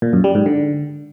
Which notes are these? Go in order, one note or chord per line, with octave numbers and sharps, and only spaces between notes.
A#2
F#2
G3
G#2
D3